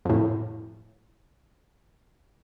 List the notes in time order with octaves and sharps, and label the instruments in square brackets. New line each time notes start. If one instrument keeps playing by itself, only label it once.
[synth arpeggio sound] F2 A2